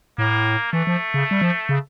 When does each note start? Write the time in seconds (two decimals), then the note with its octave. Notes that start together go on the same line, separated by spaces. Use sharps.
0.18 A2 A#3
0.73 E3 A3
0.87 F3
1.14 C#3
1.31 G3
1.42 F3
1.69 C#3